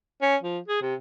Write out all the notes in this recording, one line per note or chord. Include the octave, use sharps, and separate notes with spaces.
C#4
F3
G#4
C3